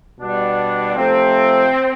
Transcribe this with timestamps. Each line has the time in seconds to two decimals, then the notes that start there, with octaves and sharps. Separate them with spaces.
0.21 B2 G3 D4
0.95 C3 F3 A3 C4